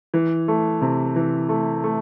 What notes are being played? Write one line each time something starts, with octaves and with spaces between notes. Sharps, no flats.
E3
A3
C3
E3
A3
A3